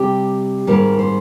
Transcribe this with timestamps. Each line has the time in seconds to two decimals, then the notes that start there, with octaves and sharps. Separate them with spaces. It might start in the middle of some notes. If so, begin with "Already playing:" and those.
Already playing: C3 G3 C4 G4
0.67 G#2 D#3 G3 C4 A#4
0.99 C5